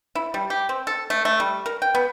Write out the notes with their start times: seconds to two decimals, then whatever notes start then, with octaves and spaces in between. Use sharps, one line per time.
0.15 E4
0.34 G3
0.50 G4
0.69 C4
0.87 A4
1.10 A3
1.25 A3
1.40 G3
1.66 A#4
1.82 G5
1.95 B3